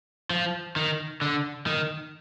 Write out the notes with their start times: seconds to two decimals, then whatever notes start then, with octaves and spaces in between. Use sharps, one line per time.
0.30 F3
0.76 D#3
1.22 D3
1.66 D#3